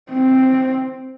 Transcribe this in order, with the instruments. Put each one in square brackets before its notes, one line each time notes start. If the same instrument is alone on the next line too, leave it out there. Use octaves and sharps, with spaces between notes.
[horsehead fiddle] C4